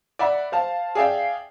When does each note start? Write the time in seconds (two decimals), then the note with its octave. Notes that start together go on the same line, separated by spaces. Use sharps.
0.19 D5 E5 F#5 B5
0.52 C5 F5 A5
0.95 G#4 D5 E5 F5 G5